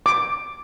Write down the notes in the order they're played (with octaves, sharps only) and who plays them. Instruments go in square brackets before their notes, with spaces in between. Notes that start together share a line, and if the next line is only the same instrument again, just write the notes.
[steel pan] D6